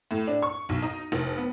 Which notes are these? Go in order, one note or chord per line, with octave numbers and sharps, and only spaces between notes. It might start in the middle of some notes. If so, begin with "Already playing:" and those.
A2
D4
C#6
B1
D#4
F1
B3